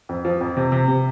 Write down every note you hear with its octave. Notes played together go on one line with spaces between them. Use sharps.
F2
F3
F2
C3
C3
C3